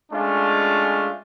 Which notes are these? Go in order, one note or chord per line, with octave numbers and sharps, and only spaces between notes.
G#3 A3 C#4 D4 F4